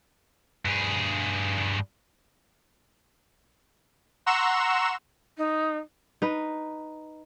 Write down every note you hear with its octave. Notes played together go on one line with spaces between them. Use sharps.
G2 G#4
F#5 A#5 C6 C#6 E6 E7
D#4
D#4 B4